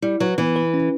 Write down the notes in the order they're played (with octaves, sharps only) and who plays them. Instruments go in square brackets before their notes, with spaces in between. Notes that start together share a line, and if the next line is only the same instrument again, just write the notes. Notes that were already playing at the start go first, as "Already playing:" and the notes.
[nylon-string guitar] G3 [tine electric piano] E4
[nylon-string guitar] F#3 [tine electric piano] B4
[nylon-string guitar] E3 [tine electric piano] B3
[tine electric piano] B4
C#4